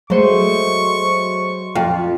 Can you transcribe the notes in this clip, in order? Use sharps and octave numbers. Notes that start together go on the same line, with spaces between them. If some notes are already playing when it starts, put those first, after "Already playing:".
F#3 G#3 A3 C5 C#6 C#7
F2 F4